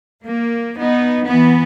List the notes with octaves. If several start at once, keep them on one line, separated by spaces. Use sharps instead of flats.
A#3
B3 D#4
E3 B3